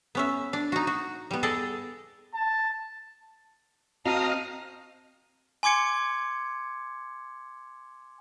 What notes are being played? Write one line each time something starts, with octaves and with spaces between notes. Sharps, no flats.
B3 C#4 E5
D4
D#4 F#4
F#4
G3 B3
G#4 A4 D5 D#5
A5
C4 F#4 D#5 F5 A5 A#5 D#6 F6
G#5 C6 D6 G#6 C#7